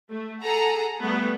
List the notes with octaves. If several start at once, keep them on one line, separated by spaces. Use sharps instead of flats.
A3
G#4 A4 F#5 A#5
G3 A3 B3